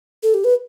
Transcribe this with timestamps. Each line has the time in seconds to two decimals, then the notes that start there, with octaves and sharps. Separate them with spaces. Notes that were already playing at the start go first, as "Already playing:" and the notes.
0.23 A4
0.34 G4
0.44 B4